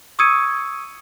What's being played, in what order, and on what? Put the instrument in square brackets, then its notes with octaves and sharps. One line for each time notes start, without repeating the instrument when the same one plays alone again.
[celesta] C#6 D#6 E6 G#6 C#7 D#7